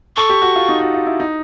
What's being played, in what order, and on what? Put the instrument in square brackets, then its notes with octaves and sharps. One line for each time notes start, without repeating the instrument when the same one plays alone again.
[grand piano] A4 [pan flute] C#6
[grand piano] G4
F#4
F4
D#4
F#4
F4
E4
D#4